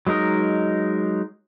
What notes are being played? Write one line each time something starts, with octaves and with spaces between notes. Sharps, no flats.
F#3 G#3 D#4 A#4 D#5